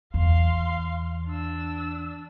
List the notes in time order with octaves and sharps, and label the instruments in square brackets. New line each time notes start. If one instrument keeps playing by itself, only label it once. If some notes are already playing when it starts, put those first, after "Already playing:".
[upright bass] E2 [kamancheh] F5 C6
[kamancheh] D4 E6